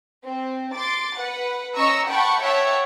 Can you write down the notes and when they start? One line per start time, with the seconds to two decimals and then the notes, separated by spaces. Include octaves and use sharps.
0.24 C4
0.73 C6 D6 A6
1.17 B4 F#5
1.76 C#4 D#5 A#5 C#6 E6
2.07 F#5 G5 A5 B5 C#6
2.42 C#5 E5 F#5 G5 A5